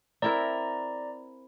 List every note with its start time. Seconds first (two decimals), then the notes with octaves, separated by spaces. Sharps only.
0.22 C4 E4 A#4 D5 A#5